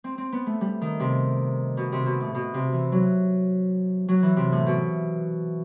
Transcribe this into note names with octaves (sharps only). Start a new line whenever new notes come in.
C4
C4
B3
A3
G3
D#3
C3
B2
C3
B2
A2
B2
C3
E3
F#3
F#3
E3
C3
A2
B2